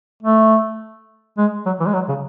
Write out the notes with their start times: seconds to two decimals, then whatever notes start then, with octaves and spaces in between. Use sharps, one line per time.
0.23 A3
1.38 G#3
1.66 F#3
1.80 E3
1.87 G#3
1.94 F#3
2.09 C#3